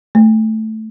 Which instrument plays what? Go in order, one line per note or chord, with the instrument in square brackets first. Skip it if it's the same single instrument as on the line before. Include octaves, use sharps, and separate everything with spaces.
[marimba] A3